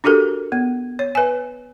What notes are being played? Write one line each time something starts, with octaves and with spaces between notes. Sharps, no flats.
D4 F#4 G4 A4 A#4
B3
C#5
B4 G#5